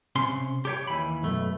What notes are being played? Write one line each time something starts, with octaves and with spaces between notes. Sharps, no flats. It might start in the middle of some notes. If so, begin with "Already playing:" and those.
C3 C#4 C6
G4 C#5 G5
D#2 E3 B5
B1 F#2 A3